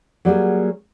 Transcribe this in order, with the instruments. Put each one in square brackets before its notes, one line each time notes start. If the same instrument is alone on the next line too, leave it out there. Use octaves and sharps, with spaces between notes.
[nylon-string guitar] F#3 G3 A#3 G#4